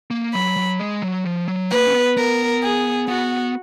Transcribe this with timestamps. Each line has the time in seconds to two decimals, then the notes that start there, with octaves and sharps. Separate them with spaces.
0.11 A#3
0.34 F#3 B5
0.57 F#3
0.79 G#3
1.02 F#3
1.25 F3
1.48 F#3
1.71 A#3 B4
1.87 C#4
1.94 B3
2.17 B3 A#4
2.63 G#4
3.08 B3 F#4